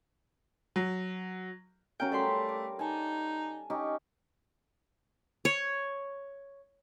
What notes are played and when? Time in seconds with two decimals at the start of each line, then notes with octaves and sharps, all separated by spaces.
0.76 F#3
2.00 F#3 C#4 A#4 F5 G5
2.12 G3 A3 A4 B5 C6
2.48 D6
2.79 D#4 G#5 A5
3.70 C#4 D#4 G4
5.45 C#5